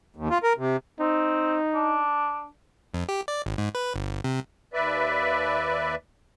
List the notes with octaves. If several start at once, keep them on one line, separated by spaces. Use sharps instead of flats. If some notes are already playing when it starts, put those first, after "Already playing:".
D#2
F4
A#4
C3
C4 D#4
D4
F2
G4
D5
G#1
G#2
B4
G1
C3
D#2 B4 D5 E5